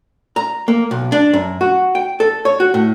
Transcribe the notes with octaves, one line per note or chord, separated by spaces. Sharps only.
A#5
A#3
B1
D4
F#2
F#4
G5
A4
C#5
F#4
A2